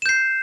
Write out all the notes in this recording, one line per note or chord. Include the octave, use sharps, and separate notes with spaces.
G6 C7 E7